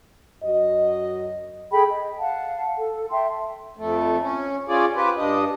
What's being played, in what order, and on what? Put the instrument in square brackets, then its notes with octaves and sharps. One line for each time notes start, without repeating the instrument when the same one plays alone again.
[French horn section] F#2 F#4 D#5
[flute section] G#4 A4 G5 B5
D#5
F5 F#5 A5
A4
E5 G5 A5 C6
[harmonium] F2 A3
C#4
C#4 F4 G#4 D5
F4 G4 B4 C5
G2 D4 D#5